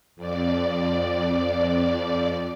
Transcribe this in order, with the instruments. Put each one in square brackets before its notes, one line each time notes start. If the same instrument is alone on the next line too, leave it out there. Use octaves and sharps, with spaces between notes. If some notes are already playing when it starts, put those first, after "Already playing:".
[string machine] F2 D5